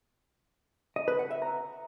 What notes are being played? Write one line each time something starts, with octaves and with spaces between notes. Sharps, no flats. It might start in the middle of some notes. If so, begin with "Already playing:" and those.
D#5
B4
F#5
E5
A#5